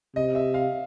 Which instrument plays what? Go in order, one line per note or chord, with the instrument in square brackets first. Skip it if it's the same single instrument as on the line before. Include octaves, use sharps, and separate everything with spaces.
[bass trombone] C3 [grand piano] D#5
[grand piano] E5
F5